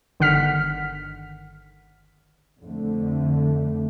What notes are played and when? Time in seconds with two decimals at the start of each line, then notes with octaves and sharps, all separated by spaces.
0.20 G1 D3 D#3 F#5 F6 B6
2.62 F2 D3 A3